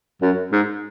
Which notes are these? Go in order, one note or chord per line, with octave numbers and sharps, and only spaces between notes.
F#2
G#2